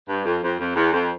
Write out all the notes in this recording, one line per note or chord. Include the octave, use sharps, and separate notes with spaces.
G2
F2
F2
F2
E2
F2